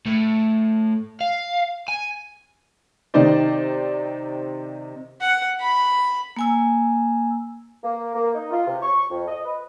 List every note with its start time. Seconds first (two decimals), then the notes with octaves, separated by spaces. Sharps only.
0.06 A2
1.21 F5
1.89 G#5
3.14 C3 D#3 D#4 C5 D5
5.21 F#5
5.60 B5
6.36 A#3 G#5 E6
7.83 A#3
8.14 A#3
8.34 D#4
8.51 F4
8.67 C3
8.82 C#6
9.10 F2
9.27 D#5
9.44 B4